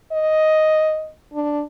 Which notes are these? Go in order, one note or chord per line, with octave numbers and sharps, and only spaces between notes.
D#5
D4